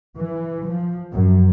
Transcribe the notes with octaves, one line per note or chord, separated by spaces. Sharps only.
E3
F3
F#2